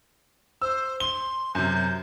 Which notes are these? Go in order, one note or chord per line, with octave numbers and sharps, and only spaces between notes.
C5 E6
C6 G7
F#2 C3 G6